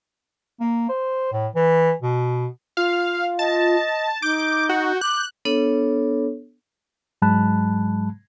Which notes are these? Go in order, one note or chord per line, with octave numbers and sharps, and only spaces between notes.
A#3
C5
A2
E3
B2
F4 F5
D#5 A5
D#4 D6 G6
F#4
D6 F#6
B3 D4 A4 C#5
G#2 F#3 G#3 A5 B5 F#6